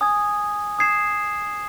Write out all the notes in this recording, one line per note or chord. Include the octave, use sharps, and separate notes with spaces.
G#5 D#6 G#6
D#6 G#6 C7 E7